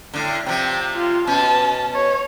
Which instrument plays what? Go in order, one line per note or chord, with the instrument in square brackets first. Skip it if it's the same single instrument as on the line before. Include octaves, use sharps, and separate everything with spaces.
[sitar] A2 D3
[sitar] C3 F3 [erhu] G5
[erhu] F4
[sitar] B2 C#4 [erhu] A5
[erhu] C#5